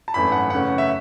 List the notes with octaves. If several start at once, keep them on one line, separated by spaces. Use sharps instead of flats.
A5
G#1 F#2 E3 A3 B5
F#5
F#2 C#3 E3 A3 C#4 F#5
E5